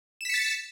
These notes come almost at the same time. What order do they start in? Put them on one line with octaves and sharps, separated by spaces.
E7 B6 C#7 A6